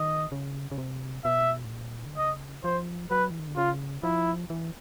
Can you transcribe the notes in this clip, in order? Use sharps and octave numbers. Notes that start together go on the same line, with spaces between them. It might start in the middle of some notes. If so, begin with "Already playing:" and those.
Already playing: D#3 D#5
C#3
C#3
C3
B2 E5
A2
A#2
D3
C#3 D#5
F3 C5
F#3 B4
E3
D#3
D3
C#3 F4
F3 E4
E3